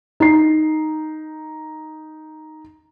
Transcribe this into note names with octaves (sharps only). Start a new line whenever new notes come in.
D#4 C7